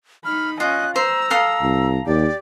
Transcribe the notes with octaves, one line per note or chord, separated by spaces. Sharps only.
D#4 B5 F6
C#4 F4 D#5 F#6
C5 A#5 E6
A4 F5 D#6
C2
D#2 G4 D5